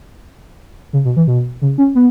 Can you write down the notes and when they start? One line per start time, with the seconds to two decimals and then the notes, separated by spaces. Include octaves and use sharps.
0.93 C#3
1.05 B2
1.16 E3
1.27 B2
1.62 C#3
1.78 C#4
1.95 B3